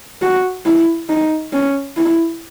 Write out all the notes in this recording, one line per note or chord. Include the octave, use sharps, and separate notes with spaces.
F#4
E4
D#4
C#4
E4